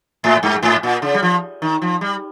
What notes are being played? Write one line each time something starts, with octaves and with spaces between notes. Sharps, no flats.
G#2
G2
G#2
A#2
C#3
G3
F3
D#3
F3
G3